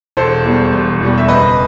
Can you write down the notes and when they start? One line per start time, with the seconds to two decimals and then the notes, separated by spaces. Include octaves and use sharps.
0.17 E1 A4 C5
0.45 E2 B2 G3
0.73 E1
1.00 E2 B2 G3
1.18 E5
1.28 F#1 B4 D#5